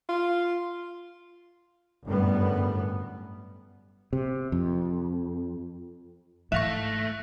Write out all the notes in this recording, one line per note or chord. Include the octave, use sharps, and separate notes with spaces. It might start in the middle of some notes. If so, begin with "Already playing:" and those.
F4
G1 F#2 A2 G3 B3
C3
F2
G#2 E3 A3 E5 F5 C#6 F#6 A#6